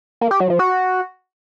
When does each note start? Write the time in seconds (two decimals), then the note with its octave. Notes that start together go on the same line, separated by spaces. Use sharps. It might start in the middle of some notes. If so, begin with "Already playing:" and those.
0.21 A#3
0.31 G4
0.40 F#3
0.50 F3
0.59 F#4